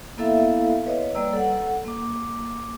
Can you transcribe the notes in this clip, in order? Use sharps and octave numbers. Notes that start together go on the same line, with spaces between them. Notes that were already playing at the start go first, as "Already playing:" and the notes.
A#3 B3 E4 A4 E5 F5
B4 C#5 D#5
G3 A#3 D5 A#5 E6
A4 F#5
A#3 D6